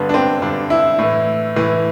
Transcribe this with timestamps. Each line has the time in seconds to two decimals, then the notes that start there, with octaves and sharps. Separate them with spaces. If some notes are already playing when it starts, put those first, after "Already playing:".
Already playing: G2 D3 B3
0.09 D4
0.14 C4
0.42 G2 D3 D4
0.70 E4
0.99 A2 E3
1.56 A2 E3